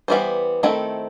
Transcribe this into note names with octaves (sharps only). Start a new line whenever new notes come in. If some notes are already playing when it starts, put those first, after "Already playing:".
E3 G3 B3 F#4 C5
D#3 A3 C4 E4 A4